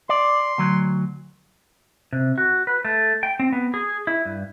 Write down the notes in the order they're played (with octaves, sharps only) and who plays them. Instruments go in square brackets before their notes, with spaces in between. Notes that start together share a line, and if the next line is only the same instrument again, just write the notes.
[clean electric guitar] D5 [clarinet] C6
[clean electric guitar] D2 F#3
[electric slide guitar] C3
F#4
B4
A3
G5
C4
B3
G#4
E4
G2